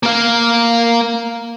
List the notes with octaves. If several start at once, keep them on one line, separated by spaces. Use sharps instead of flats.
A#3 F5